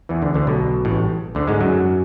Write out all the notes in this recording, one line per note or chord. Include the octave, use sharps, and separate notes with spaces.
E2 E3
D2 D3
D2 D3
B1 B2
A1 A2
D2 D3
G#2 G#3
F#2 F#3